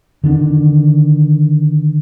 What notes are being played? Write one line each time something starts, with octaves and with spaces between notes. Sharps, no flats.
D3 D#3 C#4 D4